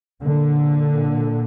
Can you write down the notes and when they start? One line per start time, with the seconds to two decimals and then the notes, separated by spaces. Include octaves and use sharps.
0.23 A#2 D3